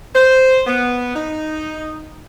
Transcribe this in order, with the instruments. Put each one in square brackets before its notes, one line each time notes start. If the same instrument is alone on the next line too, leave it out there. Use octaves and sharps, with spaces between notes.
[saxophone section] C5
B3
D#4